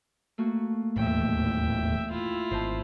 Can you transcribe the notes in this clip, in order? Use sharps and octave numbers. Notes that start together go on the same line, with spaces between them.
A3 A#3 F#4
D#1 E2 A2 E5 G5
E4 F4
G#1 C5 D#5 A5